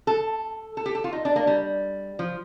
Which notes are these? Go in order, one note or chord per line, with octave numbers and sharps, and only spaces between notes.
A4
A4
G4
A4
F4
D#4
D4
A#3
G3
F3